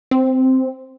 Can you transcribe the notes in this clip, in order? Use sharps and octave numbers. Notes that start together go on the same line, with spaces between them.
C4